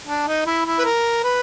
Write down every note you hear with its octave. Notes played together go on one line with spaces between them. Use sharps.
D4
D#4
E4
E4
B4
A#4
B4